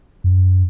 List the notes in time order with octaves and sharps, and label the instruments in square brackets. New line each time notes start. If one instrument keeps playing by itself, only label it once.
[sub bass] F#2